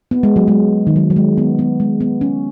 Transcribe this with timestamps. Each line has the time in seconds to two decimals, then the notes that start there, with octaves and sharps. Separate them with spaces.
0.11 B3
0.23 G#3
0.36 F#3
0.48 G#3
0.87 D#3
0.96 F#3
1.10 F#3
1.16 G#3
1.37 B3
1.59 B3
1.80 G#3
2.01 B3
2.21 C#4